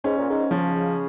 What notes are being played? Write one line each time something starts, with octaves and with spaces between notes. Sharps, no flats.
G#2 C#4
A#2
G#2
C#3 F3